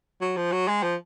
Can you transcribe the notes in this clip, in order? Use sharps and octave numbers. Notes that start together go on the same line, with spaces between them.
F#3
F3
F#3
G#3
F3